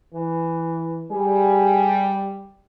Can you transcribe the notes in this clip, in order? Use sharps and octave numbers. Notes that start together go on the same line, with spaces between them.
E3
G3 G#4